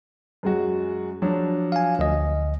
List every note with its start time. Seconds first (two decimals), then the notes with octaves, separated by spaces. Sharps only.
0.43 F#2 G#3 F#4
1.22 F3 F#3 D4
1.72 F5 G#5
1.99 D2 D#5